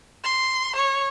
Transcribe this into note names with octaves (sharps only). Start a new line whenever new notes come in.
C6
C#5